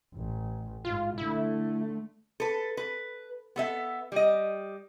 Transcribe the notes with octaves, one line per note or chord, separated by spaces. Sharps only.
A1
G#2 F4
D3 A3 E4
A4 B4
B4
B3 A4 E5
G3 D#5